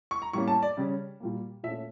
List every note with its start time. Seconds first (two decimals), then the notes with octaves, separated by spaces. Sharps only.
0.11 C#6
0.22 A#5
0.33 A2 G3 A#3 C#4 C#6
0.48 A5
0.63 D5
0.77 C#3 G3 C#4
1.20 A#2 G3 A#3
1.63 A#2 A3 C#4 E5